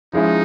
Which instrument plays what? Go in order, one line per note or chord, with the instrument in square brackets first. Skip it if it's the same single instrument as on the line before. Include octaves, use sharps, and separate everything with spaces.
[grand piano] F3 G#3 C#4 E4 [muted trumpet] D#4